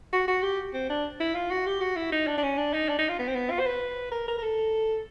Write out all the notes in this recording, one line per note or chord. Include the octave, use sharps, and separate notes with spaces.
F#4
F#4
G4
C4
D4
E4
F4
F#4
G4
F#4
E4
D#4
D4
D4
C#4
D4
D#4
D4
D#4
F4
B3
C4
B3
F4
C5
B4
A#4
A#4
A#4
A4